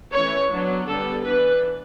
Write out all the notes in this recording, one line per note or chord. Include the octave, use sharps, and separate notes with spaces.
E3 A3 C#4 C#5
F#3 B3 D4
D3 G3 B3 A4
E3 B3 D4 B4